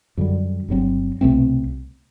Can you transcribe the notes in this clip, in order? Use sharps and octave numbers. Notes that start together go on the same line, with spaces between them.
F#2 D3 G3
G1 G2 F#3 C4
C2 B2 A3 C4